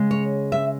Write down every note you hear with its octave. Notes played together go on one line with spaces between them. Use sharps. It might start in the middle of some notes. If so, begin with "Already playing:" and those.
Already playing: C#3 G#3
C#5
E5